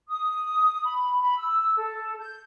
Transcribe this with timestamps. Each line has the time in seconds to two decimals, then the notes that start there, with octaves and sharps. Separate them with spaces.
0.08 D#6
0.84 B5
1.20 B5
1.37 E6
1.76 A4
2.18 G6